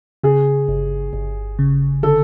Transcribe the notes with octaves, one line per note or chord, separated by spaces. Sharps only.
C#3 G#4
G1
G1
C#3
D3 A4